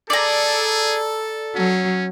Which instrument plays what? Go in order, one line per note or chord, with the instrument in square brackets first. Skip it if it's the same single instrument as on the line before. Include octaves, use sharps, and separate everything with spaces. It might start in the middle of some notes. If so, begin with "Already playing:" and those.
[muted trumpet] G#4 [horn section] A4 [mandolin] D5 A#5
[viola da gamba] F#3 [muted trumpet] C#4